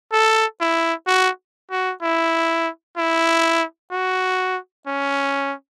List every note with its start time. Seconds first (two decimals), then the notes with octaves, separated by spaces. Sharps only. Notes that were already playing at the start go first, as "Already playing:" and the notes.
0.13 A4
0.61 E4
1.07 F#4
1.71 F#4
2.02 E4
2.98 E4
3.91 F#4
4.87 C#4